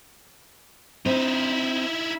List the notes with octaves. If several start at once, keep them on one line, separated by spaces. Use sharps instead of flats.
C4 D#4 E4